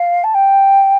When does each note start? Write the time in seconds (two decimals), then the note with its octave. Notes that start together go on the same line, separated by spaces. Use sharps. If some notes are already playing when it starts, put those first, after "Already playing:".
Already playing: F5
0.24 A5
0.34 G5